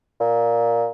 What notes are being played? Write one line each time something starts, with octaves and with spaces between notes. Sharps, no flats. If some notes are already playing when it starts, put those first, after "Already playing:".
A#2